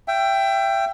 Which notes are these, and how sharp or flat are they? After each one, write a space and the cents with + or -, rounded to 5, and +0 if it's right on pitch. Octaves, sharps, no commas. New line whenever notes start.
E5 +30 G5 +0